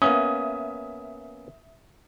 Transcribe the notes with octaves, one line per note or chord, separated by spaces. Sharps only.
A#3 B3 C#4 E5 D#6